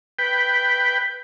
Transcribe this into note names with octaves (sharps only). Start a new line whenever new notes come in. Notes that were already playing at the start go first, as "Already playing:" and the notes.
B4 G5